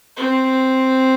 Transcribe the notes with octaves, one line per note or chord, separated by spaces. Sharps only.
C4